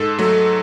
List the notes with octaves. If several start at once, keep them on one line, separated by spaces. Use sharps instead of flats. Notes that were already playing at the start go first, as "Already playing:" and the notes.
Already playing: G#2 A4
F#3 A3